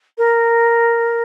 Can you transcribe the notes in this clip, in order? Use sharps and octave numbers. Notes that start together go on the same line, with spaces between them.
A#4